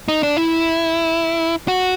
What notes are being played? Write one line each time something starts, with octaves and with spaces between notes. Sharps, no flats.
D#4
D4
E4
F#4